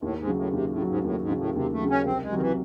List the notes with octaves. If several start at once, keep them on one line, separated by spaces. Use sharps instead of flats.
D#2 A2
G#2
C#3 F#3
A2
D#2 C3
A2
C#3 F#3
G#2
D#2 A2
G#2
C#3 F#3
A2
D#2 C3
A3
C#3 F#3
C#4
C2 C4
G#3
C3 D#3 F#3
E3